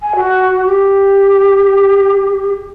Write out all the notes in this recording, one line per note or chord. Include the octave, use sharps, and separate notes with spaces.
G#5
F#4
G4